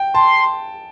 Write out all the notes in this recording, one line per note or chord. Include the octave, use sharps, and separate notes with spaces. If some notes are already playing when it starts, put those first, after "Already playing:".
Already playing: G5
A5 C6